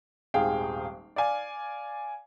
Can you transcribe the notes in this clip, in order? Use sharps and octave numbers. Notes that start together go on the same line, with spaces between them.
D#1 G#1 G#3 G#4 F5 G5
D5 F5 G#5